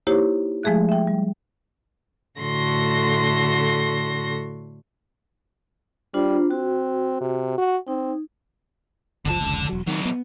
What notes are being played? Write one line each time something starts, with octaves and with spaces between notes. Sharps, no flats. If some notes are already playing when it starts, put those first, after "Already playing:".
A#3 D#4 E4 G4 C5 C#5
F3 G#3 A3 G#4 E5 F#6
E5 G5
G3
A2 D3 F#4 A4 C6 A#6
G3 D4 F4 C5
C4 F#4
C3
F#4
C4 D#4
F#1 C#2 D3 F3 A5
F1 C#2
E1 F#3
D#3 F#3 C4
B3